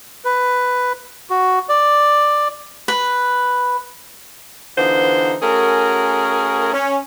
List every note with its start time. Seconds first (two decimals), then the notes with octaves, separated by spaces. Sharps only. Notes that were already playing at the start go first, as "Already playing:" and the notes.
0.25 B4
1.30 F#4
1.69 D5
2.88 B4
4.77 D3 E3 B3 D#4 F4 C5
5.42 A3 C#4 F#4 G#4 A#4
6.73 C#4